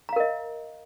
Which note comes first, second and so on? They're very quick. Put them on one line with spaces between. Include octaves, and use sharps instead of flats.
A#5 F5 A#4 D#5